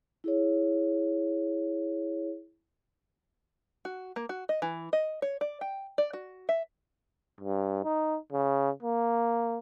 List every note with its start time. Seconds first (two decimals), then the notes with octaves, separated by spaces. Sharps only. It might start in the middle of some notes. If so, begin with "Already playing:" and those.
0.24 E4 G#4 C#5
3.85 F#4
4.16 A#3
4.29 F#4
4.49 D#5
4.62 E3
4.93 D#5
5.22 C#5
5.41 D5
5.61 G5
5.98 D5
6.13 F#4
6.49 E5
7.41 G2
7.84 D#4
8.33 C#3
8.83 A#3